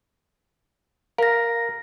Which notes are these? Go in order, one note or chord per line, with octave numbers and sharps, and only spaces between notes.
A#4 F5 A#6